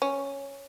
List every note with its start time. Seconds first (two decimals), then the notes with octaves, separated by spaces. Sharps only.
0.02 C#4